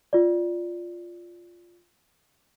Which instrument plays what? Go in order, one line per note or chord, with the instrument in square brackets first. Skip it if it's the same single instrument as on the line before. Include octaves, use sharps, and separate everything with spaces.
[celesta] F4 D5